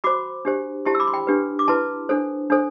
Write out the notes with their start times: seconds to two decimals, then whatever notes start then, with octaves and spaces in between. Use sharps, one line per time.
0.04 F#4 C5 B5 D6
0.45 D4 G4 C5
0.85 E4 G4 C5 A5 C6
0.95 E6
1.00 B5 D6
1.07 C6
1.14 G5 B5
1.27 D4 G4 B4
1.59 D6
1.68 E4 B4 A5 C6
2.09 D4 A4 C5
2.50 D4 A4 C5